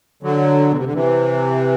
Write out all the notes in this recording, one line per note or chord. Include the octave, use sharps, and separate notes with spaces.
D3 F#3
B2
C3
D3
C3 E3